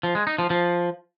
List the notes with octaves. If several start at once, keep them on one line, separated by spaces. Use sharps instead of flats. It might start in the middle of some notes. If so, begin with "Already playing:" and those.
F3
G#3
D#4
F3
F3